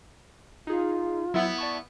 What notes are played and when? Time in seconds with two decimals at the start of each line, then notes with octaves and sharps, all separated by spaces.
0.67 D#4 F4 G#4
1.34 F#3 B3 E4 F#5
1.58 D5 A5 C#6